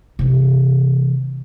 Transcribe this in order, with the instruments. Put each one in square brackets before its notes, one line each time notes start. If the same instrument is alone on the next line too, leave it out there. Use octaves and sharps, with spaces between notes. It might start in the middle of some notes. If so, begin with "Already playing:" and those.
[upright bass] C3 E3